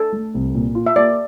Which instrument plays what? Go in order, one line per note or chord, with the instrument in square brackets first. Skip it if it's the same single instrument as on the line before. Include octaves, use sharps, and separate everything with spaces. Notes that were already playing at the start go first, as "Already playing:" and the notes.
Already playing: [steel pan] A4
[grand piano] A3
C2
A#2
F4
[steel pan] E5
[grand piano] A#3 [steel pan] D5